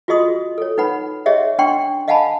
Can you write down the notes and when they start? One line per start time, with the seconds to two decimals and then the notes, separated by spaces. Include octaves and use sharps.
0.08 F4 F#4 G#4 D#5 C6 D#6
0.58 A4 C#5
0.78 D#4 B4 F#5 B5
1.26 G4 G#4 C#5 D#5 E5 F#5
1.58 C#4 D4 F#5 G5 C6 C#6
2.08 D#5 F5 F#5 G#5 A5 B5